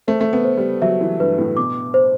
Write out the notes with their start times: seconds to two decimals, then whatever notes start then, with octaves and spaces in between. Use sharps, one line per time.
0.08 A3 C5
0.21 A3
0.33 B3
0.44 C5
0.57 G3
0.82 F#3 E5
1.01 E3
1.20 G2 B4
1.38 A2
1.57 B2 D6
1.94 C5